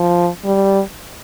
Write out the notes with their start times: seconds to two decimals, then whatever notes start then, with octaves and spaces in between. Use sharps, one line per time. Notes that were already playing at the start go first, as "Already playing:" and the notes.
Already playing: F3
0.44 G3